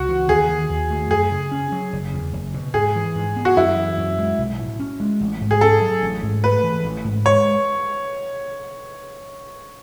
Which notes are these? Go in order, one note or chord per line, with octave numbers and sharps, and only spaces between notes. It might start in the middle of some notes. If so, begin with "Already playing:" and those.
Already playing: C#2 F#4
E3
D#2 G#4
D#3
D#2
A3
F#2 G#4
C#3
C#4
F#3
F#1
E2
F#1
B2
G#2 G#4
E3
G#2
B3
F#4
F#2 E4
E3
F#2
G#3
B1
A2
C#4
G#3
A1
G#2
G#4
C#4 A4
F#3
A1
G#2
A3 B4
E3
A1
G#2
G#3 C#5